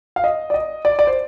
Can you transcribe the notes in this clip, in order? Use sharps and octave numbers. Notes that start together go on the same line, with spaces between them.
F5
D#5
D5
D#5
D5
D5
C5